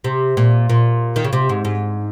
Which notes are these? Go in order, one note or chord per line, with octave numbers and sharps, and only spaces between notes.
C3
A#2
A#2
D#3
C#3
C3
G#2
G#2